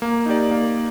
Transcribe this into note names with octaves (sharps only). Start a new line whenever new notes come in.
A#3
D#4 G4 D5
A#3